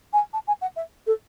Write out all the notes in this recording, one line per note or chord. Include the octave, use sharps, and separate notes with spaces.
G#5
A5
G#5
F#5
E5
A4